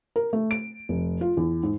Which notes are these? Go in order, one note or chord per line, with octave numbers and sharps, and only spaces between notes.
A#4
A3
D7
F1
F4
E2
G#2